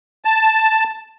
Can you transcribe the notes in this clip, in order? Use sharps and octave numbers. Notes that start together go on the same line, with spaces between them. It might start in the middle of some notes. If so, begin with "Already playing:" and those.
A5